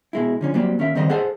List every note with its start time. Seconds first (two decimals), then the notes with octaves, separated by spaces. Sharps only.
0.13 B2 G#3 E4
0.41 D3 F3 C#4
0.54 F#3 G3 A#3 C4
0.79 D#2 C#4 A#4 E5
0.95 C#2 D#3 G3 C4 C5 D#5
1.09 G#4 A4 C5 F#5